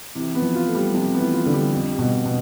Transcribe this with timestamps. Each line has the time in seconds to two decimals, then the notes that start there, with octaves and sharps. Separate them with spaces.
0.15 C3 E3
0.35 B3
0.42 F3
0.55 F4
0.68 A3
0.75 G3
0.94 C3 F3
1.14 B3
1.20 E3
1.33 F4
1.46 D3
1.54 G3
1.72 F2
1.92 G3
1.99 B2
2.12 F2
2.26 B2